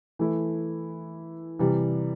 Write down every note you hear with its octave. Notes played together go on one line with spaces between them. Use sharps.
E3 A3 E4
C3 E3 G3